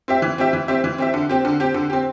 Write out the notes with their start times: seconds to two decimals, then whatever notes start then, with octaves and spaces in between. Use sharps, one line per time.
0.08 C4 G4 E5
0.22 E3
0.38 C4 G4 E5
0.53 E3
0.68 C4 G4 E5
0.84 E3
0.98 C4 G4 E5
1.14 D3
1.29 C4 G4
1.45 D3
1.60 C4 G4
1.74 D3
1.90 C4 G4